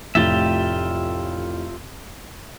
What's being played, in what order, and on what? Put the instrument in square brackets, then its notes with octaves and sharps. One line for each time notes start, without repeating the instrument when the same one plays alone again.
[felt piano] F1 A2 A6 [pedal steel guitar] F4 G4 E5